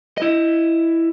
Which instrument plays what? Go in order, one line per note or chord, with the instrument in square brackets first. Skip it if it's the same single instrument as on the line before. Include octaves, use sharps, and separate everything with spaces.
[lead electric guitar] E4 D#5